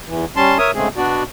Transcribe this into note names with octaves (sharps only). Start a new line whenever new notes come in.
E2 E3
G3 C#4 A5 C6
A#4 C#5 E5 D#6
G#2 C#3 G#3 A3 C4 G#4
B2 B3 D4 F#4 D5